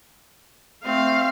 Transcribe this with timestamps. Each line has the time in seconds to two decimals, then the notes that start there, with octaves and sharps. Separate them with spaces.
0.85 A3 C4 F5